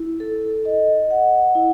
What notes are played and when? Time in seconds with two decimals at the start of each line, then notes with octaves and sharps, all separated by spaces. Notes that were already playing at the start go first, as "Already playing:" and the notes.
Already playing: E4
0.20 A4
0.65 D#5
1.11 F#5
1.55 E4